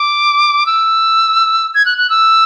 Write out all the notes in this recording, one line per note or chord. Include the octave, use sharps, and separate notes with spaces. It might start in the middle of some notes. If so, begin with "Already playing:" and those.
Already playing: D6
E6
G#6
F#6
F#6
E6